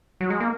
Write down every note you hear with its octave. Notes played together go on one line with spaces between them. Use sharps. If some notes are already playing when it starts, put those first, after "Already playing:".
F#3
G#3
A#3